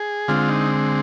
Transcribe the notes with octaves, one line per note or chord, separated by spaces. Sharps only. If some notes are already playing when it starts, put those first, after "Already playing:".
Already playing: G#4
D3 G#3 C4 F4
D#4